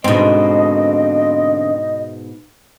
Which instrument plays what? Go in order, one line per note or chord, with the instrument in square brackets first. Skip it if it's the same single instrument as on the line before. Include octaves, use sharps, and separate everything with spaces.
[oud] G#2 B2 [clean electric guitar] D3 C4 [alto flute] D#5